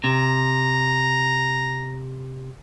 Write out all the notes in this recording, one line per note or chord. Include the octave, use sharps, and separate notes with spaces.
C3 A#5